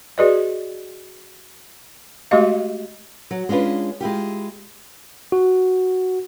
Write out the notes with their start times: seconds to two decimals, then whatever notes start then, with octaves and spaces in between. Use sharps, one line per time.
0.18 F#4 G#4 B4 D5 D#5
2.31 G#3 A3 F#4 G4 D#5 F5
3.31 F#3
3.49 G#3 C#4 D4 F4 B4
4.01 G#3 E4 F4 G4
5.32 F#4